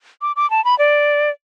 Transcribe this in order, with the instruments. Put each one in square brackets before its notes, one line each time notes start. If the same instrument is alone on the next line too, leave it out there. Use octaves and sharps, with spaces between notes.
[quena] D6
D6
A5
B5
D5